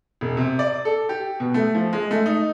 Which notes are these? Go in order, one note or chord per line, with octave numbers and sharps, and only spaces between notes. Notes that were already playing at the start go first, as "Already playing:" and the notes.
E1
C3
D5
A4
G4
B2
A3
F3
G#3
A3
D#4